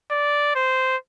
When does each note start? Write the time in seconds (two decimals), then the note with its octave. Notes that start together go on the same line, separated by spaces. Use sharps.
0.10 D5
0.55 C5